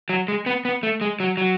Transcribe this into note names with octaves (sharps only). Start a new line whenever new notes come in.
F#3
G#3
B3
B3
A3
G#3
F#3
F#3